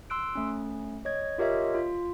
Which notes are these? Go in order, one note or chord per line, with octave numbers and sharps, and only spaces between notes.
C6 E6 F#6 D7
A3 C#4
C#5 D#5 G#6
F4 G4 A#4 C#5 D#5 E5
F4